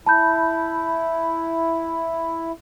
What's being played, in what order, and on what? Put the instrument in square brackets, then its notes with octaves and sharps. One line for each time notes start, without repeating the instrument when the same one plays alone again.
[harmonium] E4 [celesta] A5 B5 G6